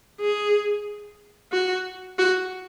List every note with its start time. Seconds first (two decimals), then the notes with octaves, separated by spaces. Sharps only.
0.20 G#4
1.52 F#4
2.18 F#4